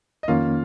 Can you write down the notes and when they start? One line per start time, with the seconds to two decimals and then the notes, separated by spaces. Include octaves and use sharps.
0.23 D#5
0.28 F2 D#3 A#3 C#4 F4 F5